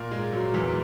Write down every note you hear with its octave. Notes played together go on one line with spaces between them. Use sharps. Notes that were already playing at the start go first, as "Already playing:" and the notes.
Already playing: A#2 A#3
G#2 G#3
F#2 F#3
E2 E3